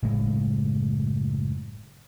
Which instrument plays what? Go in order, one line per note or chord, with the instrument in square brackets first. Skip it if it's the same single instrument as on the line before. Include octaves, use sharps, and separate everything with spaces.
[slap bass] F#1 A2 G#3